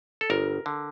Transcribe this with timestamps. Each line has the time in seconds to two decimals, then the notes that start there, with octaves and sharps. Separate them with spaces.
0.21 A4
0.30 G1 A#4
0.66 D3